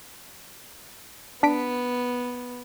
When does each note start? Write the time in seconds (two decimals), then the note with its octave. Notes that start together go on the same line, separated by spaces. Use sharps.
1.43 B3 D4 B6 D7